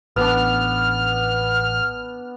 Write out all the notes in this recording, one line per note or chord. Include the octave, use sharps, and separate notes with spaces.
A1 B3 D4 F6